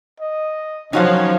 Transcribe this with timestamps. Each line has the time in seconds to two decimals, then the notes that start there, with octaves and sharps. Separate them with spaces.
0.20 D#5
0.93 D#3 F3 F#3 C#4 D#4 F#4 C#5 F5